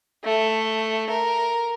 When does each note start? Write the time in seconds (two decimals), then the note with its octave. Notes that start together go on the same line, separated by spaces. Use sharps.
0.25 A3
1.10 A#4